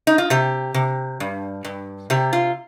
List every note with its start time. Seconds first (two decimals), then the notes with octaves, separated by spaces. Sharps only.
0.07 D#4
0.18 F4
0.30 C3 G4
0.74 C3
1.20 G2
1.65 G2
2.10 C3 G4
2.33 F4